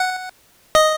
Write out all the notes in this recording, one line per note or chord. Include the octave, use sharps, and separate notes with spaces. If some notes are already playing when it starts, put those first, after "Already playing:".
Already playing: F#5
D#5